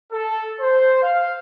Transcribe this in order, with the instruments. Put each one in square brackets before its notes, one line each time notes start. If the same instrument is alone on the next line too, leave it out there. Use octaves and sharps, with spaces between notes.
[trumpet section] A4
C5
F5